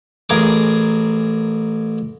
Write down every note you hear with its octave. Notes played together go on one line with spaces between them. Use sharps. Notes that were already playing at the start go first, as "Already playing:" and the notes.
A1 G#4 A#4 D6